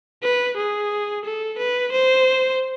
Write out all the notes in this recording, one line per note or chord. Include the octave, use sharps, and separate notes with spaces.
B4
G#4
A4
B4
C5